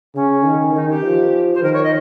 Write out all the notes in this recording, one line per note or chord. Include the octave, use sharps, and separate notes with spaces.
C#3 C#4
D#3
D#3 D#4
G4
F3
C5
D#3 A#4
C#5
D#5